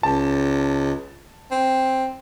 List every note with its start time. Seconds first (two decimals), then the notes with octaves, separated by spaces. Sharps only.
0.03 C#2 A5
1.51 C4